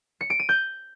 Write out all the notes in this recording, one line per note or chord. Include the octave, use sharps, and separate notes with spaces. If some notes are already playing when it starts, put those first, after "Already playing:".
C#7
D7
D#7
G6